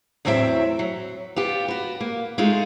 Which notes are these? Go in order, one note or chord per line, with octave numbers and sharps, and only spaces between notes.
E2 A2 F#3 C4 A4 E5
F#3
B3 F4 G4
F#4 B4
A#3
G#3 A3 D#4 F4